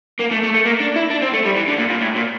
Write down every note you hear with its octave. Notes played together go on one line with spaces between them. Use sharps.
A#3
A3
A3
A3
A#3
D4
E4
D4
C4
A3
G3
E3
D3
A#2
A#2
A2
A#2